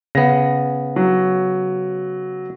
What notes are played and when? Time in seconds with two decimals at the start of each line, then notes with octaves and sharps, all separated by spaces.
0.15 C#3 B3 A#6
0.96 F#3